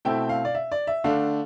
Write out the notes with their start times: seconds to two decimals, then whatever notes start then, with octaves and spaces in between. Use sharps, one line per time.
0.05 B2 A3 C4 E4 G5
0.29 F5
0.45 D5
0.55 E5
0.72 D5
0.87 E5
1.04 D3 A3 D4 F5